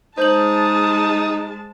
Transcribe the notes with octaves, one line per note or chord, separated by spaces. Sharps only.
G#3 D#4 C5 A5 G6 F#7